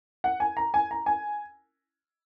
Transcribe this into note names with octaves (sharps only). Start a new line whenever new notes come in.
F#5
G#5
A#5
G#5
A#5
G#5